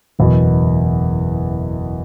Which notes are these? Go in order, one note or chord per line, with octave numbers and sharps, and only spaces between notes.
F#1 E2 B2